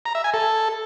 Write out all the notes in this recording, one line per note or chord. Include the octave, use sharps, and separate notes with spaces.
A#5
E5
G#5
A4